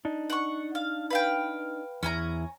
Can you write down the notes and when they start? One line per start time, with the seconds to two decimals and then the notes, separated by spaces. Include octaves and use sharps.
0.05 D4 D#4
0.30 F#5 C#6
0.75 F5
1.10 B4 F5 G5
2.03 E2 C#4 E4 G#5 A#5